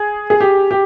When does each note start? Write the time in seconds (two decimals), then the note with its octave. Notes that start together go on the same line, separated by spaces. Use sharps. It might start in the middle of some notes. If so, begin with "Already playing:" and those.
Already playing: G#4
0.30 G#4
0.41 G4
0.71 G4